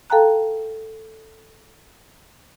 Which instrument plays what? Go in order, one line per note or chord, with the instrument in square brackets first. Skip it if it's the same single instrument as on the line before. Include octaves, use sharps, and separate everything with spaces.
[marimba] A4 F5 G5 A5 A#5 F#6